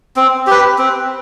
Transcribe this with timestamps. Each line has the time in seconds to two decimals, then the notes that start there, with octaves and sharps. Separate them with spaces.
0.16 C4
0.47 G4 B4
0.78 C4